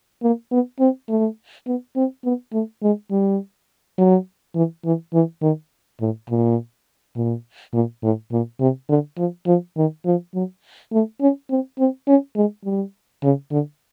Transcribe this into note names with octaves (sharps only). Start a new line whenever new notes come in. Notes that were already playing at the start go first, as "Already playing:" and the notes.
A#3
B3
C4
A3
B3
C4
B3
A3
G#3
G3
F#3
E3
E3
E3
D#3
A2
A#2
A#2
A#2
A2
A#2
C3
D3
F3
F3
D#3
F3
F#3
A3
C#4
C4
C4
C#4
G#3
G3
C#3
D3